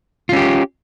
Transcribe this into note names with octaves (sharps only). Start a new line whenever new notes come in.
C#4 F4 G4